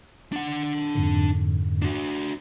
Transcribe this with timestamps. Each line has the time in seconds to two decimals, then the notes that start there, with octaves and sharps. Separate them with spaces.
0.32 D4 F#5
0.95 F2 G#2 D3
1.82 D4 F#4